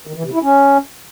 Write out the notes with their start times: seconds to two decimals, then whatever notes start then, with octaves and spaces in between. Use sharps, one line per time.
0.07 D#3
0.16 E3
0.25 C3
0.33 E4
0.42 C#4